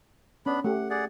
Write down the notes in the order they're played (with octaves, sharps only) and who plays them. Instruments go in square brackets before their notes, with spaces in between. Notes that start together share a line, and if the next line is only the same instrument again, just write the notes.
[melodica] B3 D4 B5 [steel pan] C#4
[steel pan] A3 G4 [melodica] F#5
[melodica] G#4 D5 F#5